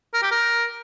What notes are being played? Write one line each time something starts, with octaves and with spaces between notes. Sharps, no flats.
A#4
G4
A#4